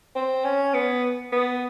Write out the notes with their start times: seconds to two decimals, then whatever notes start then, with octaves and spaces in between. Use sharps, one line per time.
0.15 C4
0.44 C#4
0.74 B3
1.32 B3